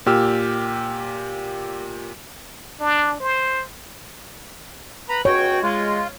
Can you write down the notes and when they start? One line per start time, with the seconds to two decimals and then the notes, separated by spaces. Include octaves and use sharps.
0.06 A#2 G4 E6 F6
2.81 D4
3.20 C5
5.09 B4 A#5 B5
5.25 C#2 B2 F#4 C#5 G5
5.63 G#3 F4